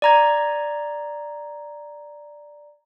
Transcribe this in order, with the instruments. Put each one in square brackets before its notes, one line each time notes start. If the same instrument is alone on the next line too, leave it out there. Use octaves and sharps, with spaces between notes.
[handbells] D5 A#5 G#6